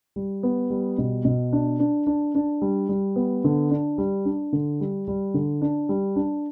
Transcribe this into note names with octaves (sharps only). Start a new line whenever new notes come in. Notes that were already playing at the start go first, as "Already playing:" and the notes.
G3
B3
G3
B2
B2
D4
D4
D4
D4
G3
G3
B3
D3
D4
G3
D4
D3
G3
G3
D3
D4
G3
D4